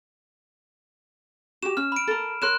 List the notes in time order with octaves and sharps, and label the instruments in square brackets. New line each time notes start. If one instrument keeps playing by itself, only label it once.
[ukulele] F#4 G4 [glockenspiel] E7
[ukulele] C#4 [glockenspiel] F6
[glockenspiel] B5 D7
[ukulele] A4 A#4
[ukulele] A#4 C#5 [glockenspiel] C6 F#6 E7